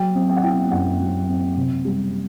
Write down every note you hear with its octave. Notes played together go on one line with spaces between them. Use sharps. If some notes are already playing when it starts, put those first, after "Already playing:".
Already playing: F#3 G5
C4
G5
F#5
E4 G5
F#2 F#5
F#3
C4
C3
G3